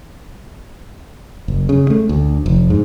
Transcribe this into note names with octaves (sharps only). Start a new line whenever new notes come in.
F#1
C#3
A3
D2
F1
G#2